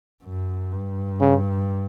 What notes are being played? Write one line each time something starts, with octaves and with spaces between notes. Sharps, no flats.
F#2
G2
C#3